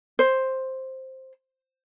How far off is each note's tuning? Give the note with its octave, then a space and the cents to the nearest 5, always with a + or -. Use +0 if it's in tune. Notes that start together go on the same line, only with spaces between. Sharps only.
C5 +5